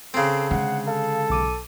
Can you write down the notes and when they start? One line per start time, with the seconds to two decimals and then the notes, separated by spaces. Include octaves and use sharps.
0.14 C#3 C4 A4
0.51 D3 G#3 F#5
0.88 A4 F5
1.30 B1 D6 D#7